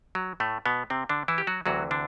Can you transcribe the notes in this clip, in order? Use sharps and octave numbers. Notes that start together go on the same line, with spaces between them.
F#3
A2 A3
B2 B3
C3 C4
D3 D4
E3 E4
G4
F#3 F#4
D2 C3 E3 F#3 F#4
D3 D4